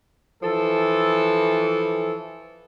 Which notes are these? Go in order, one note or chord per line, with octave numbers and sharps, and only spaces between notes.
E3 F3 A4